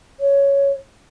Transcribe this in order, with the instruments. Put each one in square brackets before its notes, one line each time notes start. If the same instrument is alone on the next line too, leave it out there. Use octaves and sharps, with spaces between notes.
[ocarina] C#5